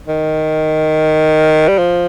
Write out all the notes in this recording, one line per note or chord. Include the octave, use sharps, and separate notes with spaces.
D#3
G3
F3